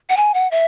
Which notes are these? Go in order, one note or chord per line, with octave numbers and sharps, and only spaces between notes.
F#5
G#5
F#5
E5